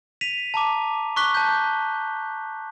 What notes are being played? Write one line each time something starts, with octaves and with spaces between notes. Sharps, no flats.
B6 D#7 F7
A5 A#5 D6
C#6 D6 F#6 B6 G7
A5 G6